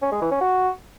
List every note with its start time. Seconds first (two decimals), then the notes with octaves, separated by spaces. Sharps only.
0.02 C#4
0.12 G#3
0.22 E3
0.31 C#4
0.41 F#4